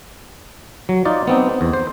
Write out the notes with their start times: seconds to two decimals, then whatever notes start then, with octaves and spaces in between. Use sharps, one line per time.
0.89 F#3
1.05 D#4 F4 D5
1.27 B3 C4 D#4
1.61 E2
1.74 C5